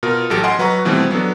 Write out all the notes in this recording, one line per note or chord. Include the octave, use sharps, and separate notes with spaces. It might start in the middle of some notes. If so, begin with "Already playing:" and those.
B2 F4 A#4 F6
A1 F#3 G4 A4 D7
D#5 F#5 G#5 C6
F#3 B4 F#5 A#5 C#6
B2 E3 F3 G3 A3 C4
F#3 B3 D4 A4